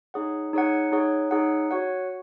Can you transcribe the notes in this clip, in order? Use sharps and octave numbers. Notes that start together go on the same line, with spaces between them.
D#4 G#4 C#5 F#5
D#4 G#4 C#5 F#5
D#4 G#4 C#5 F#5
D#4 G#4 C#5 F#5
F#4 C#5 F#5